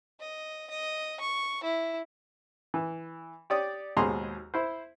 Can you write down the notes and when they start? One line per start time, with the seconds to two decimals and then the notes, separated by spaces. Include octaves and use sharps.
0.20 D#5
0.70 D#5
1.20 C#6
1.64 E4
2.74 E3
3.50 G4 C#5 D5 D#6
3.97 D#2 G#2 B2 G#4 A#5 C6
4.54 E4 C5